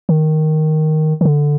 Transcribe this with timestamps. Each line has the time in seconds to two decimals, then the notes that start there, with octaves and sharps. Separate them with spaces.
0.09 D#3
1.21 D#3
1.25 D3